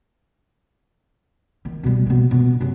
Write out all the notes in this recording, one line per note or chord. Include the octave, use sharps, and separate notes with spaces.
D#3
B2 G3
B2 A#3
B2
F#2 C3